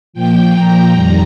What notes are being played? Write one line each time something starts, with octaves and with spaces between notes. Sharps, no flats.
A#2 F3 G5
A#5
F2 D#3 G3